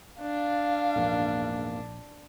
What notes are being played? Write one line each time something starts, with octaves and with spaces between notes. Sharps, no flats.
D4 F5
A#1 E2 G#2 A#3